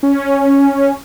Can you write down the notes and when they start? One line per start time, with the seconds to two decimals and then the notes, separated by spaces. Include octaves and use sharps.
0.03 C#4